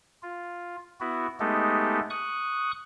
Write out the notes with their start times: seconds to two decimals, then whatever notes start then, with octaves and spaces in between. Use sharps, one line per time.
0.23 F4
1.00 B3 E4 F#4
1.40 G#3 A3 B3 D#4 G4 A4
2.10 C#6 D#6 F#6